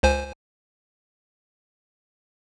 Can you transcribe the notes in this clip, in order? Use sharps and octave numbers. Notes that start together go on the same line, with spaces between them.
C#2 C5 G#5